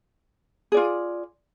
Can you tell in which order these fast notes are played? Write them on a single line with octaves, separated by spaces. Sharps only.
G#4 D5 F4